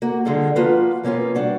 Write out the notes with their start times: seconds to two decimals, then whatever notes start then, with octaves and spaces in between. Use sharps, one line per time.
0.02 A#3 F#4
0.25 D3 G3 G#3 D4 F4 A4
0.56 F3 A#3 F4 F#4 B4 F5
1.03 B2 A#3 C#4 F4 B4
1.35 G3 D4 F#4